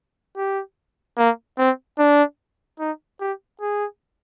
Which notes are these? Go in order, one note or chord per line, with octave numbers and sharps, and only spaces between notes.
G4
A#3
C4
D4
D#4
G4
G#4